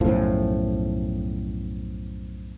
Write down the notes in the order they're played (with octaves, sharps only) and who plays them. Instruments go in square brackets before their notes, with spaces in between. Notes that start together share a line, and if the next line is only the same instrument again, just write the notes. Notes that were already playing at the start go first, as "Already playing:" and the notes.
[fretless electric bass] B1 F#2 A2 F3